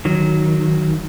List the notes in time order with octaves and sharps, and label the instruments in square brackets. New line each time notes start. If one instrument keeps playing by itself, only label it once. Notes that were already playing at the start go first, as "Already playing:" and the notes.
[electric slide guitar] D#3 F#3